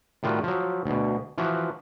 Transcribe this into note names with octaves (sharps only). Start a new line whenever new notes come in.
A2 D#3 G3 F4 F#4
F3 F#3
D2 B2
E3 F3 E4 F#4